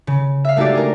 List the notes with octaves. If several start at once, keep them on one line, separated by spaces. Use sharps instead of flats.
C#3
E5 F5
G#3 A3 D#4 F#4 G4 D5
D4 G#4 A#4